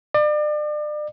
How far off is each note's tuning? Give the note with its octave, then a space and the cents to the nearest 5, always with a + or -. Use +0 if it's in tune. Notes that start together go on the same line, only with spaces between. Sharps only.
D5 +35